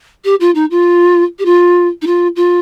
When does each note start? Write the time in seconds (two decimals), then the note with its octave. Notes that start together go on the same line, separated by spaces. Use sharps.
0.24 G4
0.40 F4
0.55 D#4
0.71 F4
1.39 G4
1.45 F4
2.02 D#4
2.07 F4
2.36 F4